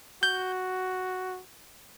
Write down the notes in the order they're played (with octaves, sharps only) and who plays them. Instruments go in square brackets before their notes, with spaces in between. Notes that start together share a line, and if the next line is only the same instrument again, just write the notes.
[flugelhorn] F#4 [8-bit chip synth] G6